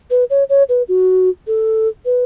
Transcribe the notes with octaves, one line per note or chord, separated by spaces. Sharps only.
B4
C#5
C#5
B4
F#4
A4
B4